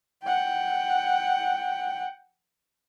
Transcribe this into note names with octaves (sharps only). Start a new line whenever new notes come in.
F#5 G5